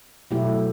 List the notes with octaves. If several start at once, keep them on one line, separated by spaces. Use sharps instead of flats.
B2 F#3 A3 E4 G4